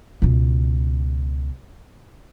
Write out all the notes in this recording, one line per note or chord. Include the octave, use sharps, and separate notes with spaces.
C#2 B2